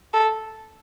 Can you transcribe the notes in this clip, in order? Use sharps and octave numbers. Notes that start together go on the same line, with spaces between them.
A4